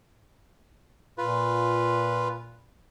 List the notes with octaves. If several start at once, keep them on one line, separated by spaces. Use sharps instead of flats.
A#2 F4 B4